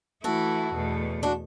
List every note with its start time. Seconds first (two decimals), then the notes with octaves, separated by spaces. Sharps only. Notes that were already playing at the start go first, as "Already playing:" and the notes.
0.24 E3 A3 E4 F#4 A4
0.73 E2 B2 A3
1.23 D4 F#4